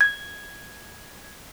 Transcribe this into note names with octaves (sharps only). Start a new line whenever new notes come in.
G#6